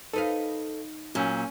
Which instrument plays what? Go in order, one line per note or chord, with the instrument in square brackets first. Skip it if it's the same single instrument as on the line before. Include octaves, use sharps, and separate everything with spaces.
[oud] D#4 B4 F5 [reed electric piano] A4
[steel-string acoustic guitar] A#2 [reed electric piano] F#3 E6 G6 [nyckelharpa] C#4